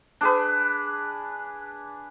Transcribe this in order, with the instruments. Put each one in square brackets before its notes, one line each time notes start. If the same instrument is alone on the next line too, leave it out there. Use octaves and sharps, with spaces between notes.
[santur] D4 G#4 B4